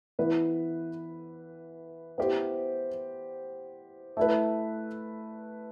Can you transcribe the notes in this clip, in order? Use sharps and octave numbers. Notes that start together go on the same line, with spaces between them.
E3 B3 E4 B4
B3 E4 G4 C5
A3 E4 B4